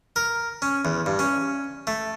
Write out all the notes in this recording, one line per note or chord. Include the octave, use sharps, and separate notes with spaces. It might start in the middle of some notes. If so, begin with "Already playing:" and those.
A#4
C#4
E2
G2
C#4
A3